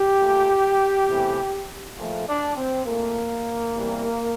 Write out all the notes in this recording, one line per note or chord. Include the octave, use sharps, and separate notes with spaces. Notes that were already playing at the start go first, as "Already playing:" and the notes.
Already playing: G4
A#2 A3
E2 C3 E3 A3
A#2 F3 A3
D4
C4
A#2 A3 A#3
E2 C3 E3 G3